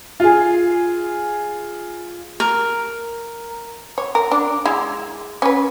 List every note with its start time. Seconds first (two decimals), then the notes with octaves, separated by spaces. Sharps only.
0.20 F4 G#4
2.40 A#4
3.98 C#5
4.15 A#4
4.31 D4
4.65 G#3 E4
5.42 C#4 B4